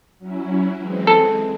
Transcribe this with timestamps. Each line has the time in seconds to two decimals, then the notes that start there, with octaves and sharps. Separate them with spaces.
0.19 F#3 C#4 E4
0.78 E3 G#3 C4
1.07 A4